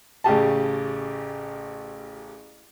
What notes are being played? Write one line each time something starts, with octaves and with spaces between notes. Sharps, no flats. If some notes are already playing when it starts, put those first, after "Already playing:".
A1 C#3 G4 A5